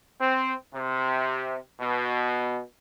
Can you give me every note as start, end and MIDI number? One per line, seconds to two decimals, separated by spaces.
0.20 0.53 60
0.74 1.57 48
1.80 2.60 47